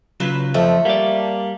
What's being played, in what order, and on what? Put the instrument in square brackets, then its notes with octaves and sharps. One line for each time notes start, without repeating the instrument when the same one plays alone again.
[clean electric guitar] C#3 F#3 F4 [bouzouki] B4
[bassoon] F2 [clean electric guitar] F3 [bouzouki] A3
[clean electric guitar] G3 D5 [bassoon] A#3